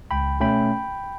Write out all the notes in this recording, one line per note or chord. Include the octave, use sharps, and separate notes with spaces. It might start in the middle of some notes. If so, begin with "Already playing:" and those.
C#2 G5 B5
B2 A3 C#4 G5 B5